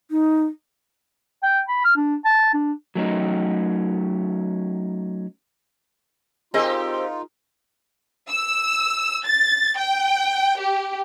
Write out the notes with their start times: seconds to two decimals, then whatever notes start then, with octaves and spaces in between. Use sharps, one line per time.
0.11 D#4
1.43 G5
1.68 B5
1.84 F6
1.96 D4
2.24 A5
2.53 D4
2.95 F#3 A3 C#4 D#4
6.54 C4 D#4 F4 G4 G#4 A#4 D#5
8.29 E6
9.25 A6
9.77 G5
10.59 G4